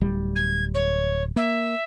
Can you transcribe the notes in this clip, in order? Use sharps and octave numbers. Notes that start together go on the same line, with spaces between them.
D1 G3
G#6
C#5
A#3 E5